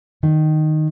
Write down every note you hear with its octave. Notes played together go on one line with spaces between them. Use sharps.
D#3